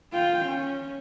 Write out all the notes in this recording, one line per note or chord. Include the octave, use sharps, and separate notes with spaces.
F4 G5
C#4